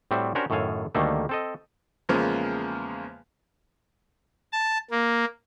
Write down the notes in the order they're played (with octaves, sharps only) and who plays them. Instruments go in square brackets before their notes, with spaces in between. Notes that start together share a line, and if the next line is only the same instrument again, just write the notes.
[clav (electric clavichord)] A2 G3 C4 F#4 E5
C#4 D4 F#4 G4 A#4 C5
F#2 A2 D#3 A4 F5 G#5
D2 D#3 G3 A3 A#3 A4
C4 A4 D#5
[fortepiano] E2 C#3 F3 G#3 A#3
[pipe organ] A5
A#3